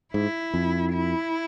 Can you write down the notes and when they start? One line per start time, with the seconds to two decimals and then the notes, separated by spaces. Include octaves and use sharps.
0.14 G#2 E4
0.54 F2
0.93 E4